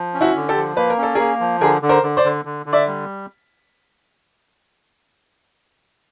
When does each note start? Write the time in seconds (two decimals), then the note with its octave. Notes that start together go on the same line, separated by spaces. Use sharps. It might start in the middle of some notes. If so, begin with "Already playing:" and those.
Already playing: F3
0.14 C#4
0.21 E4 F#4
0.36 D3
0.49 G4 A4
0.57 F3
0.77 A#3 B4
0.90 A#4
0.98 C#4 A4
1.15 A#3 G#4 A#4
1.40 F3
1.61 D3 G#4 A#4
1.82 D3
1.89 A#4 C5
2.03 D3
2.17 C5 D5
2.24 D3
2.45 D3
2.66 D3
2.73 D5 E5
2.87 G3